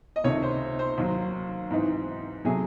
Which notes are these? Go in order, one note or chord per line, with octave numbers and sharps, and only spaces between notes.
D#5
C#2 C3 D#3 A3 D#4 C#5
C5
C5
D#2 D#3 F#3
G#2 E3 C4 D#4
C3 F#3 A3 G#4